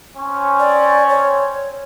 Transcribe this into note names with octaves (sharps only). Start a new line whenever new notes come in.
C4 C#4
D5
C#5